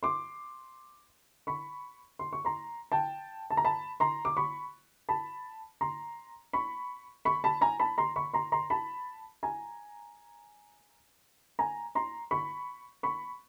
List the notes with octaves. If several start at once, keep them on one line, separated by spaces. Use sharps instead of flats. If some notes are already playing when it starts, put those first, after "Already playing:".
C6 D6
B5 C#6
C6
C#6
A#5 C6
G5 A5
A5
A#5
A5 B5
A#5 C6
D6
B5 C#6
A5 B5
A#5 C6
B5 C#6
B5 C#6
A5 B5
G#5 A#5
A5 B5
A#5 C6
B5 C#6
A#5 C6
A#5 C6
A5 B5
G#5 A#5
G#5 A#5
A#5 C6
B5 C#6
B5 C#6